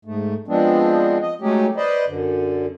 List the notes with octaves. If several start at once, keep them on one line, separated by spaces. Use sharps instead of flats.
G#2 A3
F3 G#3 B3 C4 D4
D#5
F#3 G#3 A3 C#4 D#4 G4
B4 C5 D5 D#5
F#2 D3